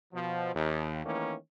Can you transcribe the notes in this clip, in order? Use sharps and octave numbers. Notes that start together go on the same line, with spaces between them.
B2 F3
D#2
D#3 E3 A3 A#3 C#4